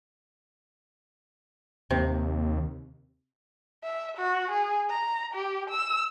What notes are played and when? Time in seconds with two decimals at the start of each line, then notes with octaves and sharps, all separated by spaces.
1.91 D#2 C3
3.84 E5
4.18 F#4
4.51 G#4
4.90 A#5
5.34 G4
5.70 E6